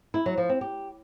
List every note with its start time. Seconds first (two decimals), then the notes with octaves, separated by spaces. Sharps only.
0.14 E4
0.26 F#3
0.38 F3
0.49 C4
0.61 G4